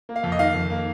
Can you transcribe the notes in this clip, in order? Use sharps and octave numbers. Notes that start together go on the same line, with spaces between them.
A#3
F5
F2
D#5
D#3 F5
F2
A#3